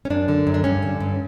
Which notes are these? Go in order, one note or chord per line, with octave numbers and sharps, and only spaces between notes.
C#4
F#2 D4
D3
F#2
D4
G2 C#4
D3
G2